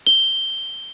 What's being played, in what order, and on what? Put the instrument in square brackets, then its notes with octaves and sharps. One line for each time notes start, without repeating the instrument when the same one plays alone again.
[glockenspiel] G7